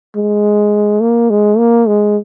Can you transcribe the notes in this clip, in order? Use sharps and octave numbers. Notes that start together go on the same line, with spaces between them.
G#3
A#3
G#3
A#3
G#3